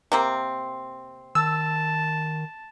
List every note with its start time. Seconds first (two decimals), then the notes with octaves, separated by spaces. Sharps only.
0.12 C3 A#3 C4
1.35 D#3 A5 E6